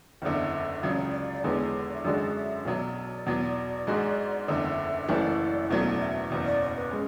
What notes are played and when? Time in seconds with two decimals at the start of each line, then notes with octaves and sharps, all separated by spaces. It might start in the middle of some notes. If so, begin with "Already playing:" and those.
0.22 F#1 E2 D3 E5
0.83 C#2 C#3 F#3 D5
0.96 C#5
1.10 D5
1.33 D5
1.44 E2 D3 G#3 B3 C#5
1.94 E5
2.04 F#2 D3 G#3 D4 F#4 D5
2.35 E5
2.65 B1 B2 F#3 D5
3.26 E2 B2 F#3
3.87 G#2 G#3 D4 F#4
4.48 F#1 E2 D3 E5
5.02 E5
5.08 F#1 F#2 E3 A3 D5
5.60 E5
5.69 F#1 E2 B2 F#3 A3 D5
6.00 E5
6.30 F#1 E2 B2
6.45 D5
6.60 C#5
6.75 B4
6.91 G#3 C#4